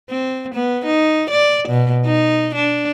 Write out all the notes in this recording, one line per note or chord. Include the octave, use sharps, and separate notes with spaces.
C4
B3
D#4
D5
B2
D#4
D4